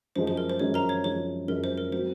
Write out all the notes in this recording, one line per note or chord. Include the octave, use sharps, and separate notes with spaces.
F#2 F3 G#3 C5
C5
A#4
C5
F#2 F3 G#3 C#5
A#4 A#5
C#5
F#2 F3 G#3 C#5
F#2 F3 G#3 A#4
C5
A#4
F#3 C4 F#4 C5